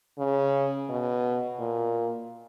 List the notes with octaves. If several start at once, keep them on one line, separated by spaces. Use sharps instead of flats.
C#3
B2
A#2